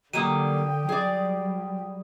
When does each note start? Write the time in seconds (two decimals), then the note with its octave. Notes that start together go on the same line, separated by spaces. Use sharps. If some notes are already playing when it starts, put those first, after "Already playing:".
0.13 D3 F#3 G3 A#3 G5 D#6 D#7
0.89 F#3 G3 G#4 D5